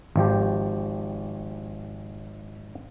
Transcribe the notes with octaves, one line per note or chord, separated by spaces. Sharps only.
G#1 F3 G4